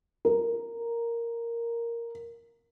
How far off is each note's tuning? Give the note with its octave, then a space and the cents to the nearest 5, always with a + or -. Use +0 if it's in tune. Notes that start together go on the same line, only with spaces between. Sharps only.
A#4 +0